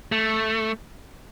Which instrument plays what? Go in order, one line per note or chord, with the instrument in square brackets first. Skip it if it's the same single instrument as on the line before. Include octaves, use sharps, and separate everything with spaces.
[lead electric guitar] A3